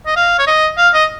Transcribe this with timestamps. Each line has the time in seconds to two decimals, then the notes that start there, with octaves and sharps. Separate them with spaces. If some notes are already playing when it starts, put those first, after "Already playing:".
0.06 D#5
0.16 F5
0.39 C#5
0.47 D#5
0.78 F5
0.94 D#5